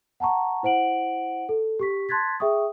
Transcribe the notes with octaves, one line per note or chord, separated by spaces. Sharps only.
F#5 A5 A#5 C#6
E4 C5 F#5 D7 F#7
A4
G4 C#6 B6
A5 C6 F#6 G#6 A6 B6
G#4 E5 G5 C#6 D#6